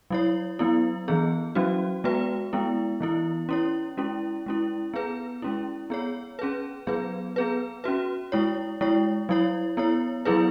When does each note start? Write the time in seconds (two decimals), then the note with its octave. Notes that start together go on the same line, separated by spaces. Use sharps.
0.11 F#3 E4 C#5
0.59 F#3 B3 E4
1.08 E3 B3 G#4
1.55 F#3 C#4 F#4
2.04 G#3 B3 F#4 B4
2.53 G#3 B3 E4
3.00 E3 B3 E4
3.49 C#4 E4 C#5
3.97 G#3 C#4 E4
4.46 G#3 C#4 E4
4.94 B3 G#4 B4
5.42 G#3 C#4 E4
5.90 B3 G#4 C#5
6.39 C#4 G#4 B4
6.87 F#3 B3 G#4 B4
7.36 B3 G#4 B4
7.84 C#4 F#4 B4
8.32 G#3 E4 C#5
8.81 G#3 E4 C#5
9.29 F#3 E4 C#5
9.77 B3 E4 C#5
10.25 F#3 B3 E4 G#4 B4